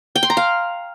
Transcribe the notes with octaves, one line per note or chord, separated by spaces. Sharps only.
G5
C6
A#5
F5